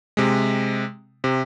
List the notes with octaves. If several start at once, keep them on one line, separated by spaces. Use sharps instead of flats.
C3 G#3
C3